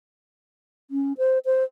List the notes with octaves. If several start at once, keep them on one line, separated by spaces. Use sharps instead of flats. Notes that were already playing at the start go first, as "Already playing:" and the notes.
C#4
C5
C5